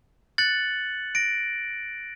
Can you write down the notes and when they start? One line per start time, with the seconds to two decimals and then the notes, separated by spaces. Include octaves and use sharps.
0.38 F#6 A6 C#7 F#7
1.15 A#6 D7